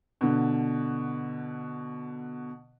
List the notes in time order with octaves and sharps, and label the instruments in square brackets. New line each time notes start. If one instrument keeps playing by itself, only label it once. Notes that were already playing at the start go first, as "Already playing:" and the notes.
[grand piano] B2 D3